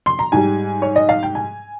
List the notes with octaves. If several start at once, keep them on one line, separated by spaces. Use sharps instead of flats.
C6
A#5
G#2 G3 G#5
C#5
D#5
F5
G5
G#5